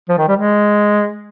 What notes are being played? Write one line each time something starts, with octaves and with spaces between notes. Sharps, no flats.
F3
D#3
G3
G#3